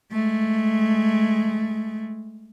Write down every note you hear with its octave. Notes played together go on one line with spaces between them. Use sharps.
G#3 A3